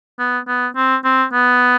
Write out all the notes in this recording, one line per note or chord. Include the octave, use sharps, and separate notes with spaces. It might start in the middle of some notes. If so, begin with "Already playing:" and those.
B3
B3
C4
C4
B3